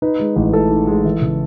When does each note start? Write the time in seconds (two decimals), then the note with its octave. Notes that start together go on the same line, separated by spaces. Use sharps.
0.02 D#4 B4
0.20 G#3
0.36 A1
0.53 A2 A4
0.71 D#4
0.87 G#3
1.04 E3
1.21 C#3